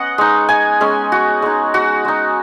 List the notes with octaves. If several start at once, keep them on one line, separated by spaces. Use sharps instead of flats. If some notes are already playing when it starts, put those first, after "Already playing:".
Already playing: B3 C#4 D#5 F#5
G#3 D#4
G#5
G#3 C#4
F#4
G#3 D#4
F#4
G#3 D#4